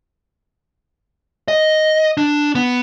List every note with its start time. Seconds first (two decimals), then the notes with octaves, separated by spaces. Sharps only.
1.48 D#5
2.17 D4
2.55 B3